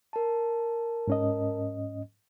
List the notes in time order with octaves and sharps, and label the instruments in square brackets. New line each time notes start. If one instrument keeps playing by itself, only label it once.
[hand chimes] A#4 A5
[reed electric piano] G#2 C#4 D#5